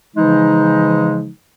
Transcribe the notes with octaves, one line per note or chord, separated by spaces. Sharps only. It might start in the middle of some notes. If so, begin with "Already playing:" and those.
C#3 E3 F3 G#3 D#4